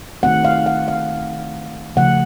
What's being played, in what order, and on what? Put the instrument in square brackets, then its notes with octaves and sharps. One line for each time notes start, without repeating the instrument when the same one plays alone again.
[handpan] D#3 A3 C4 F#5
F5
F#5
F5
C#3 F3 A3 F#5